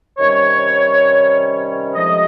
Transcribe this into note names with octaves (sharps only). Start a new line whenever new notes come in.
C3 D#3 G3 C#4 C#5
F2 C3 F3 G#3 D#5